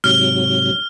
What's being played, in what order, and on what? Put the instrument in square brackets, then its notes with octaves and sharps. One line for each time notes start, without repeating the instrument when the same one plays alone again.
[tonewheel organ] G#2 C3 F#3 [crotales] F6